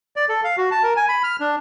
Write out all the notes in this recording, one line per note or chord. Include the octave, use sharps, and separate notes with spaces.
D5
A4
F5
F#4
A5
A#4
G#5
B5
F6
D4